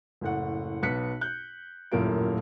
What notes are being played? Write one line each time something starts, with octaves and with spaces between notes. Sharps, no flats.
F#1 A2 F#5
B1 B3 F#6 B6 C#7
F#6 G6
D#1 F#2 A2 A#3 F4 D7